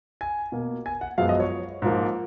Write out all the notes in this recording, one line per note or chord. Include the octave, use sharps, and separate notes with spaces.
G#5
B2 A#3
G#5
F#5
F#2 F3 G#3 B3 F5
D#5
C#5
G#2 F3 A#3